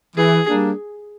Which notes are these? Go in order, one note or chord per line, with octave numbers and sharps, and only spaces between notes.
E3 G#4
G3 A#3 D4